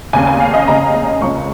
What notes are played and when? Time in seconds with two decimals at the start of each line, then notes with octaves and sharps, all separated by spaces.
0.13 F1 D#2 C#3 G#5
0.27 G#5
0.40 F5
0.54 D#5
0.68 F1 D#2 C#3 A#5
1.21 C#2 C#3 F3 A#3 C#4 C#6